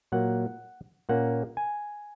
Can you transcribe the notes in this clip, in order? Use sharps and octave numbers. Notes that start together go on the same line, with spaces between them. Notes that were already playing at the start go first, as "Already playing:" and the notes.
A#2 F#3 A#3 F#5
A#2 A#3 C#4 F#5
G#5